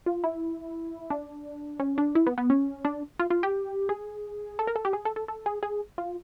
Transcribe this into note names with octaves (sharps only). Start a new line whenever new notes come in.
F4
E4
D4
C#4
D4
E4
B3
B3
C#4
D4
F4
F4
G4
G#4
A4
A#4
A4
G4
G#4
A4
A4
A4
G#4
G#4
F4